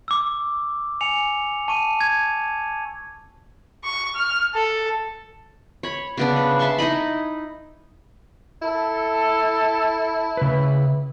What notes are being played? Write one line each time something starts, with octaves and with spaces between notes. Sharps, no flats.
D6 E6
G#5 C#7 F7
A5 C#6 D#7
G#6
C#6
F6
A4
C#5 B5
C#3 B3 D4
B4
E5 A5 C6 C#6
D#4 E4 D#5 B5
E4 A4
C#3 B4